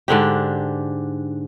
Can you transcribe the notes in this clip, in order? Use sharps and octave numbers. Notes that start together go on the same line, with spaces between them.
G#2 D3 D4 G4